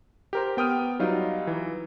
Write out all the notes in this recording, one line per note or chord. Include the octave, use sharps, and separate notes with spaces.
G4 A#4 C5
B3 G5 D#6 F6 D#7
F#3 G3 D#4 F4
E3